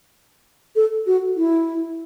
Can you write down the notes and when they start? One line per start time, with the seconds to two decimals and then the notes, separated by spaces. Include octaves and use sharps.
0.76 A4
1.07 F#4
1.37 E4